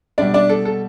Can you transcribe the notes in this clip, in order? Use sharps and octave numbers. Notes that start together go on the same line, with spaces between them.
B2 G3 D4 D5
D4 D5
A4
A4